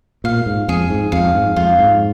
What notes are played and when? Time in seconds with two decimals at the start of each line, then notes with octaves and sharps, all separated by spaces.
0.24 A#2 F5
0.46 G#2
0.68 F2 G#4
0.90 G#2
1.12 F2 F5
1.34 G#2
1.56 F2 F4
1.79 G#2